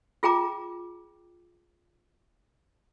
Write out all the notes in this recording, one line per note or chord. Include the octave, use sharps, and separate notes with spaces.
F4 G#4 G5 A#5 D6